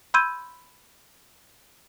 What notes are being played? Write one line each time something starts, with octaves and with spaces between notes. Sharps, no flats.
B5 C6 E6 G6 G#6 D#7